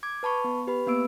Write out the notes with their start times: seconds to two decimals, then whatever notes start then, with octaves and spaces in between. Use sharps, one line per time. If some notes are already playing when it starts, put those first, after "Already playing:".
0.03 D6 G#6
0.23 B4 A5 B5 C#6
0.44 B3
0.67 G4 B4 B5
0.87 A#3 B3 B4 E6 D7